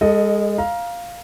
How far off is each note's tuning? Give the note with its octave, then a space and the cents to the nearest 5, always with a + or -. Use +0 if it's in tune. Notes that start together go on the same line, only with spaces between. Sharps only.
G#3 -25 A4 +15 D#5 +0
F5 +0 A#5 +20